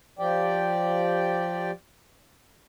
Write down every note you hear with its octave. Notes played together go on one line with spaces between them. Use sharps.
F3 G4 D5 G5